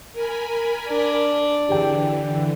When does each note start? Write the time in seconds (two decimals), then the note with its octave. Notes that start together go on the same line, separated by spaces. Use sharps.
0.13 A#4 G#5 B5
0.88 D4
1.69 D3 E3 G4 G#4 G5